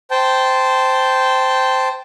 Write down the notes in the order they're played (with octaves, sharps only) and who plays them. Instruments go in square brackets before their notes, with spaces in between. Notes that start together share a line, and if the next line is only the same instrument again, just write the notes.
[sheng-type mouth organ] C5 G5 A5